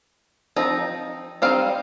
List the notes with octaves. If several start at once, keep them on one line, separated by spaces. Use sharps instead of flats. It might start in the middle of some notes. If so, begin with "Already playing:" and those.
F3 C4 D#4
G3 C4 D#4 F5